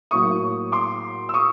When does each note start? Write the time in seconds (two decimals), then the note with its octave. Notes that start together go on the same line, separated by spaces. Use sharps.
0.11 A2 F#3 A#3 C#6 D#6
0.72 C6 D6
1.29 E6
1.34 C#6 D#6